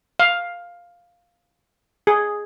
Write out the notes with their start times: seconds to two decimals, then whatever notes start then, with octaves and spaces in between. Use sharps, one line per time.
0.20 F5
2.07 G#4